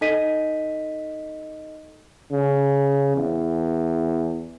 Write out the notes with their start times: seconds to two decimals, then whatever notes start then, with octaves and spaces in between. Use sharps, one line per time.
0.01 D#4 A4 D#5 B6 D#7
2.31 C#3
3.16 E2